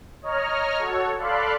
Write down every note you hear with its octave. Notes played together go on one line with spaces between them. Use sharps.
C#5 D#5 A#5 F6
F#4 A4 C#5
A4 D5 F5 B5 C6 F#6